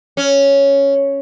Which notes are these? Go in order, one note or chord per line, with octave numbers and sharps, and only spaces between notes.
C#4